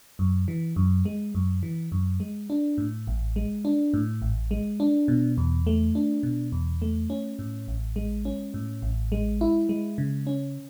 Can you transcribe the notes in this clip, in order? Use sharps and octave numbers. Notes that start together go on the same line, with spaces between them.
F#2
E3
F#2
G#3
F#2
E3
F#2
G#3
D4
A2
A1
G#3
D4
A2
A1
G#3
D4
B2
E2
A3
D4
B2
E2
A3
C#4
A2
A1
G#3
C#4
A2
A1
G#3
E4
G#3
C#3
C#4